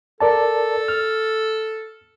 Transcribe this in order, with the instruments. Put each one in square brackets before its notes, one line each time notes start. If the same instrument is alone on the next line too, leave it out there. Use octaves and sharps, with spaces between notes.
[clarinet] A4 [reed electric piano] A#4 D5 A5
[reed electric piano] F6